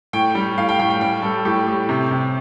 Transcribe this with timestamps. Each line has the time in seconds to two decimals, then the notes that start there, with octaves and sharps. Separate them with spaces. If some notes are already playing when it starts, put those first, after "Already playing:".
0.13 A2 G5
0.35 G3
0.58 A2 F5
0.69 G5
0.79 A2 G5
0.90 G5
1.01 G3 G5
1.22 G3 A4
1.45 A2 G4
1.67 A2
1.89 C3
2.11 C3